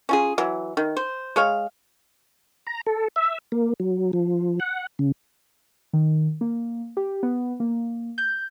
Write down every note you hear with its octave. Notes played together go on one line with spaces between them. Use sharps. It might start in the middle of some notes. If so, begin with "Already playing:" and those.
C#4 F4 G#4
E3 F#3
D#3
C5
G#3 C#5 F5
A#5
A4
E5
A#3
F#3
F3
F#5
C#3
D#3
A#3
G4
B3
A#3
G6